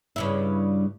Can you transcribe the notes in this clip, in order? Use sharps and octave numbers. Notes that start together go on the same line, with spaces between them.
G2 C#3 E4